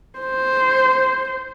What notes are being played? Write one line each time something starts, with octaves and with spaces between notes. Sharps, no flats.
C5